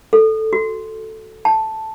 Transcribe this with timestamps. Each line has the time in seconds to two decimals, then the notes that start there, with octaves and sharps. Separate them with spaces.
0.13 A4
0.53 F#4
1.45 A5